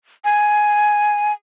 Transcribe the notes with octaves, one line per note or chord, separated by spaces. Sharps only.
G#5